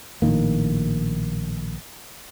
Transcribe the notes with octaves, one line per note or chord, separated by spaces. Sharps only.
A#1 A2 D#3 A#3